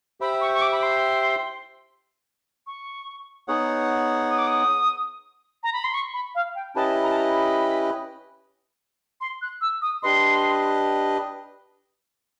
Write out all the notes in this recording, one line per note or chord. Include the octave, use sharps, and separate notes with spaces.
G4 C5 E5 G5 B5
C#6
C#6
D6
B5
C6
C#6
B3 D#4 G#4 C#5 F#5
D#6
D6
D#6
A#5
B5
C6
C#6
B5
F5
G5
C#4 E4 G4 B4 D#5 A5
A#5
A5
A#5
B5
C6
F#6
E6
D#6
D4 G4 B4 D#5 C6